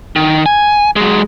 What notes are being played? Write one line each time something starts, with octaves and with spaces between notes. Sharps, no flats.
D#3
G#5
F#3 G#3